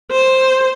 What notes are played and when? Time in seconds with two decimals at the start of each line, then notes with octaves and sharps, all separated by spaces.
0.12 C5